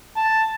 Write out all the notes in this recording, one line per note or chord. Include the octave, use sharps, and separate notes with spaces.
A5